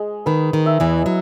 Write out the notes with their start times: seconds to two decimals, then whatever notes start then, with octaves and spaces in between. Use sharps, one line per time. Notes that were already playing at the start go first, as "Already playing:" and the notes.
Already playing: G#3
0.26 D#3 B4
0.53 D#3
0.66 E5
0.80 E2 E3
1.06 F#3